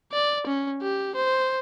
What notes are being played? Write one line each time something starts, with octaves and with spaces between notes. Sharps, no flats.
D5
C#4
G4
C5